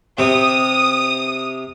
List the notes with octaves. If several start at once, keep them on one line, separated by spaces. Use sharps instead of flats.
C3 D#6